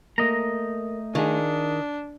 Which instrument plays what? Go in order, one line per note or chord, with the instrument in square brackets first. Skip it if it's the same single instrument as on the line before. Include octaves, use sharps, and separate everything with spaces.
[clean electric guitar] A3 D#5 A#5 [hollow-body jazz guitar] A#3
[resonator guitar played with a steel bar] D#3 [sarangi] D4 [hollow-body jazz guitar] F4 G#4